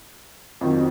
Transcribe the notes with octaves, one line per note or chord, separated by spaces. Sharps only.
F2 D#3 F#3